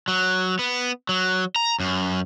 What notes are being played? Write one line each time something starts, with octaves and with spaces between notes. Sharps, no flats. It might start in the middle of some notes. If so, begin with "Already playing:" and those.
F#3
B3
F#3
A#5
F#2